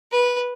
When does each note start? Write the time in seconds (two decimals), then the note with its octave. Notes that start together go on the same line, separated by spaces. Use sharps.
0.12 B4